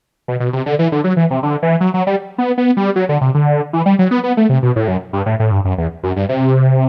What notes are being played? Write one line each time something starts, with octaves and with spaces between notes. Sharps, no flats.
B2
B2
C3
D3
E3
D3
F#3
E3
C3
D3
E3
F#3
F#3
G3
B3
B3
G3
F#3
D3
C3
D3
E3
G3
F#3
B3
B3
A3
C3
B2
A2
F#2
G2
A2
A2
G2
F#2
E2
F#2
G2
C3